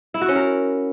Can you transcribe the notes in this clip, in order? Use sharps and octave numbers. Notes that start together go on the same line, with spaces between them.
E4
F#4
C#4
A#4